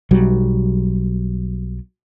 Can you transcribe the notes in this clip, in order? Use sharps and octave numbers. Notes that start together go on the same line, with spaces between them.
B1 F#3 G3